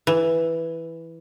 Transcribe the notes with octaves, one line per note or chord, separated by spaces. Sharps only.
E3